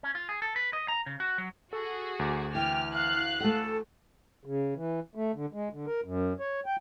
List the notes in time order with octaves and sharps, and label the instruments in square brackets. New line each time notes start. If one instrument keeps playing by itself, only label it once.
[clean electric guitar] C#4
F4
G#4
A4
B4
D#5
A#5
C#3
F#4
F#3
[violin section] F#4 G#4 [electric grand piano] A4
[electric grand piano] D2 D6
[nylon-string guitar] E3 [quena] G5 [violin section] F6
[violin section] F5 F#6 [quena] F6
[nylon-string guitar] A3 F#5 [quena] A4
[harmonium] C#3
E3
A3
D3
G#3
D3
A#4
F#2
C#5
G5